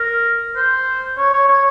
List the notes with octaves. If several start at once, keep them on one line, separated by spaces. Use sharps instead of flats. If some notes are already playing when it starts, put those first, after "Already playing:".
Already playing: A#4
C5
C#5
C#5
C#5